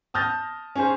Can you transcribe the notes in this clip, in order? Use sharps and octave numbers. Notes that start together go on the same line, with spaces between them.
A5 D#6 F6 G6 A6 A#6
C#4 G#4 C5